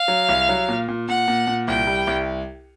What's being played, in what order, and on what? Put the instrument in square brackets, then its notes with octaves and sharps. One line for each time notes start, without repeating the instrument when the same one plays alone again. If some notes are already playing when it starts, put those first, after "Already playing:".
Already playing: [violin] F5
[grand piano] F#3
C2
F#3
A#2
A#2
[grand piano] A#2 [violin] F#5
[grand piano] A#2
A#2
[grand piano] C2 [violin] G5
[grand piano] G3
C2